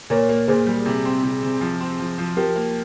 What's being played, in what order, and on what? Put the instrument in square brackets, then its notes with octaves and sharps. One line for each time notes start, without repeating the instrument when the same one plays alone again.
[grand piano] A#2 [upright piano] A#4 C#5
[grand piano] A#3
[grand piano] A#2 [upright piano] G#4 C5
[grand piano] G3
C3
C4
C3
C3
F3
C4
F3
F3
[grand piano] F3 [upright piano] G4 A#4
[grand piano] A#3